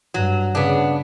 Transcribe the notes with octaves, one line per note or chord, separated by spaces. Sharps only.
G2 F#3
C#3 B3 D4